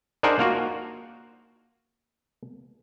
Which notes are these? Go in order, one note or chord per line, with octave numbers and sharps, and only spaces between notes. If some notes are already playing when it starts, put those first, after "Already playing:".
D4 D#4 G#4 A#4 C5 F#5
A#3 F4 F#4